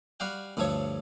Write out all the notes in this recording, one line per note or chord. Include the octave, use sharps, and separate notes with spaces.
G3 F#4 F5 G5
D2 G2 F3 A4 C#5 C#6